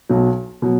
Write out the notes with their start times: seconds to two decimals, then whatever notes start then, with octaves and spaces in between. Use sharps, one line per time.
0.09 B1 B2 F#3
0.62 B2 F#3